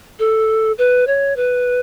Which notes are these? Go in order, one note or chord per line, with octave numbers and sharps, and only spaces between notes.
A4
B4
C#5
B4